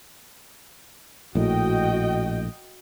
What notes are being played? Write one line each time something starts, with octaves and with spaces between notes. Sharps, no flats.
A#1 A2 F#4 D#5 G5